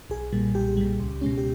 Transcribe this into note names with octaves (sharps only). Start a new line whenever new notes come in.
B1 G#4
A#2 G3
B1 G4
A#2 G3
C#2
B2 G#3 C#4
G4